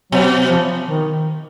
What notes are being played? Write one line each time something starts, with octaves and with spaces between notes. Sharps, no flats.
B2 F#3
F3
D#3